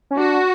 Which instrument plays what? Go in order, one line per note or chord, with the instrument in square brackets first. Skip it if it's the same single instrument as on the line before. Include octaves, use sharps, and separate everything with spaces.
[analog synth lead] C#4
[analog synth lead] D4 [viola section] F#4